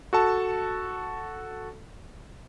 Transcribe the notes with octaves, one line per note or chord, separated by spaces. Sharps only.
F#4 A4 A5